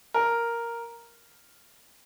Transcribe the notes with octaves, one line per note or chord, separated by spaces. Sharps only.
A#4